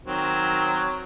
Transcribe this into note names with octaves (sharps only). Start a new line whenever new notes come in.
D#3 F#3 C4